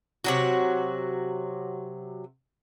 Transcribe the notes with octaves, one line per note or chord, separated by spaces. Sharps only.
C3 F#3 F#4